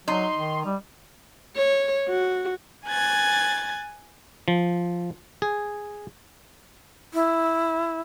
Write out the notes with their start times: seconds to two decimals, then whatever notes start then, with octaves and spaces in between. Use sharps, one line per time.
0.08 F#3 D#4 C6
0.36 D#3
0.65 G3
1.56 C#5
2.08 F#4
2.86 G#5 F#6 G#6 A6
4.48 F3
5.42 G#4
7.14 E4